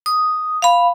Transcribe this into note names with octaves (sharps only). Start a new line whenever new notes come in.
D#6
F5 B5